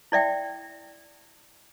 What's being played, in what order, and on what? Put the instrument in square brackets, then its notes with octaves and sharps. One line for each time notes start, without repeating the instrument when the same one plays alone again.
[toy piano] E4 D5 E5 G5